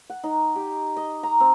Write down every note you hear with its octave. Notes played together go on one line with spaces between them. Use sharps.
F#5
D#4
G4
D#5
A#5
C4